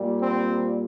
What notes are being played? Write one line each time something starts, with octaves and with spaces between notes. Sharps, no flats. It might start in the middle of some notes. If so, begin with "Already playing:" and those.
Already playing: A#2 G3
C4